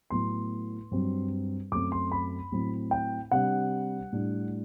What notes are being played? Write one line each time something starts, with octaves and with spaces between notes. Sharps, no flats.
A2 F#3 B3 C6
G2 F#3 C4
F#2 F#3 A3 C4 D6
C6
B5
A2 F#3 C4
G5
C3 G3 D4 F#5
A2 G3 D4